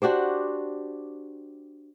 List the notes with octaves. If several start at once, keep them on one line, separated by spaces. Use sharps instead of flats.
D4 F#4 G4 C5